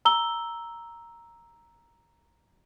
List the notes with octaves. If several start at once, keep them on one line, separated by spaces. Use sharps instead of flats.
A#5 E6 G7